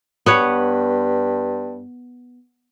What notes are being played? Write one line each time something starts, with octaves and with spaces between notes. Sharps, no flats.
G2 B3 B4 C#5